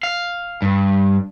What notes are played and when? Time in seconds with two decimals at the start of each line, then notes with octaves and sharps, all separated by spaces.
0.03 F5
0.62 G2